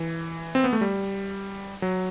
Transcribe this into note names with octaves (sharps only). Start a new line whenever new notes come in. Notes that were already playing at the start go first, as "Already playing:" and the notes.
Already playing: E3
C4
B3
A3
G3
F#3